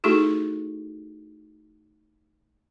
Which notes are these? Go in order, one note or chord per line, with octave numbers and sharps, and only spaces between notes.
A3 D#4 E4 F#4 G#4 A4